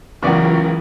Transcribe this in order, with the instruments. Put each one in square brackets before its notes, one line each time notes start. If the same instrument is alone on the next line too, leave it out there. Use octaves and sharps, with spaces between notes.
[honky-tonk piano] C#2 C#6 [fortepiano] C#3 B3 D5 [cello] E3 [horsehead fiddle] F#3 A#4